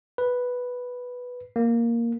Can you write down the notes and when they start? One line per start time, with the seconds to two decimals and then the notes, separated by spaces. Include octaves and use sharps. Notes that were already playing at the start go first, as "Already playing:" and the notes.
0.18 B4
1.56 A#3